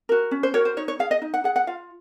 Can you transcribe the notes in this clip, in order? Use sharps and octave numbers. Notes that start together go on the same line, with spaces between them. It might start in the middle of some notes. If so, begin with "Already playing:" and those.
F#4 A#4
C#4
C5
F#4 A#4 C#5
C5
D#4 C#5
C#5
G#4 F5
D#5
D#4
F#5
G#4 F#5
F#5
F4 F5